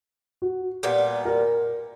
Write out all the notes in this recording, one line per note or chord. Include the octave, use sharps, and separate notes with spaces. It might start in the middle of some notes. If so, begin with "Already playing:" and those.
F#4
A#2 G3 B3
A#4